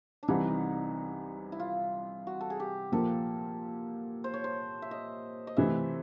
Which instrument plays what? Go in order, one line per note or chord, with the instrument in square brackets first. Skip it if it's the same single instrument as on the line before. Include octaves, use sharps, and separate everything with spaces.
[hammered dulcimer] D4
[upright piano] C2 C3 E3 [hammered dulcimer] D#4
[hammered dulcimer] E4
F4
F#4
A4
G#4
G4
[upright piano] A#2 F3 A#3 [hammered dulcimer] A4
[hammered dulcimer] C5
C#5
C5
E5
D#5
D#5
[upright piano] C3 E3 A3 [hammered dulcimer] E5